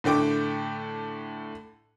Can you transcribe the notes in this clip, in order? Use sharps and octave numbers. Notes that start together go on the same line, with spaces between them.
A2 D3 A3 G5 D6